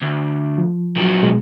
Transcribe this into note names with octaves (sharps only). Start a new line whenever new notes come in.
D2
F3
A#2 F#3
B2 G#3